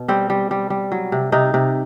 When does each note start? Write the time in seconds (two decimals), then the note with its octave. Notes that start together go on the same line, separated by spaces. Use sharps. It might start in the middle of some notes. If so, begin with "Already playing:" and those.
Already playing: B2
0.08 G3 C4
0.30 G3
0.51 G3
0.70 G3
0.92 F#3
1.12 C3
1.32 C3 D#4
1.54 C3